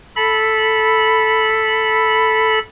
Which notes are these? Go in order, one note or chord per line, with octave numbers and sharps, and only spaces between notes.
A4 B5